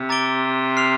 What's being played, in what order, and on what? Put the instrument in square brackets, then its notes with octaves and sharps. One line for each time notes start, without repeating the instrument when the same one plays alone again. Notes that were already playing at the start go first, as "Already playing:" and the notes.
Already playing: [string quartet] C3
[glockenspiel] A#5 D6 A6 D7 G7
F6 C7 F7